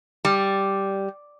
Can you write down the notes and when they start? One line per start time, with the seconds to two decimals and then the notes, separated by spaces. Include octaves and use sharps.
0.25 G3